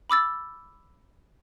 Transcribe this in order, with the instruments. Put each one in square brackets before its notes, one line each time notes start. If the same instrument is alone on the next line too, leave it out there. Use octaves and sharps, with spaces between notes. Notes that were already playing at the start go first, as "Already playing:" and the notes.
[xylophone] B5 D6 E6 A6